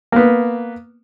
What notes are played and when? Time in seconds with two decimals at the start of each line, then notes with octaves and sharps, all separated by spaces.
0.12 A#3 B3